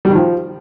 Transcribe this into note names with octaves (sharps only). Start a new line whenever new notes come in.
G3
D#3
F3